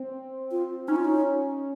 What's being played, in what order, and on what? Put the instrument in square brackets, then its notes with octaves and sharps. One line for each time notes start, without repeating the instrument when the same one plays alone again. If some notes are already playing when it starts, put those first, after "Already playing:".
Already playing: [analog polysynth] C4
[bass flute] F4
[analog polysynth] C#4 [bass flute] D#4
[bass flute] F4
D#4